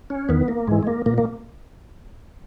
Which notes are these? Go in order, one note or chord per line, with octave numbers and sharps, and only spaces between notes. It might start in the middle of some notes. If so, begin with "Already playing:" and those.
C#4
E2 D#3 B3
A#3
G#2 E3 G#3
G#3
A#3
A#2 A#3
A#3